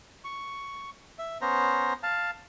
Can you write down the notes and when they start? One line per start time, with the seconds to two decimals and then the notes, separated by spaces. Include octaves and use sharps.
0.24 C#6
1.18 E5
1.41 B3 C#4 C5 A#5
2.03 F5 A5